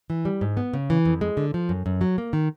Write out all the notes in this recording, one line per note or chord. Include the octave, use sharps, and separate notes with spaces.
E3
G3
G#2
B3
C#3
E3
F2
G#3
D3
F3
F#2
F#2
F#3
A#3
D#3